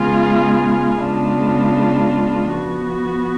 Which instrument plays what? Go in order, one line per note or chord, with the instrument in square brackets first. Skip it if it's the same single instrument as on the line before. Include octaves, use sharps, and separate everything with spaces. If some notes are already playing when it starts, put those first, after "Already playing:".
Already playing: [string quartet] C#3 G#3 B3 F4 G#4
C#3 G#3 B3 D4 F4
F3 B3 F#4